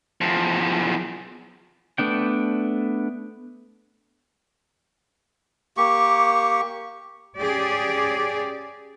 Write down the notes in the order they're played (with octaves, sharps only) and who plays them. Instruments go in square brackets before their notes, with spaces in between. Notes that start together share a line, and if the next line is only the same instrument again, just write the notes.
[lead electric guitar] E2 F3
[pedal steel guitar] A3 B3 D4 G5
[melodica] A#3 G4 C#6
[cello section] C#4 G4 G#4 D5